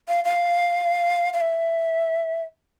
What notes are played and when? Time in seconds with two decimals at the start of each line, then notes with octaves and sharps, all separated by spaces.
0.08 F5
0.25 F5
1.33 F5
1.41 E5